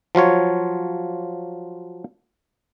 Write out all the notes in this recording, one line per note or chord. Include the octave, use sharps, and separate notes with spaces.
F3 F#3 F4 C#5